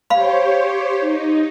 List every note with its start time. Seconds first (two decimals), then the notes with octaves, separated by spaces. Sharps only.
0.10 G4 C5 C#5 F5 B5
1.00 D#4